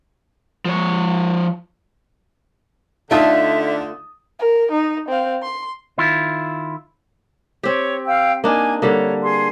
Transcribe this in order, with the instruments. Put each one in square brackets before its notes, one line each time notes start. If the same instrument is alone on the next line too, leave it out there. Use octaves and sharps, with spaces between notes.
[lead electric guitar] F3 C#5
[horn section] D3 [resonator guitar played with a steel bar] A3 F4 [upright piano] D#4 A5 D#6 [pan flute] E5
[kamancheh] A#4
D#4
C4 F5
C6
[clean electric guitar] D#3 E4 F4
[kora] C4 G4 [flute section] C#5
[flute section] F5 G5 E6
[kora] A#3 D4 D#4 [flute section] G#5
[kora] D3 G3 A#3 [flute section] C#5
[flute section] G#4 C6